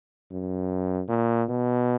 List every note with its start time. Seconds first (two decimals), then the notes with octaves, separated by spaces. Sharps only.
0.31 F#2
1.09 A#2
1.49 B2